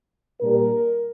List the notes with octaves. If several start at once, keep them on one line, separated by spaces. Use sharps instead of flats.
A#2 G3 D4 A#4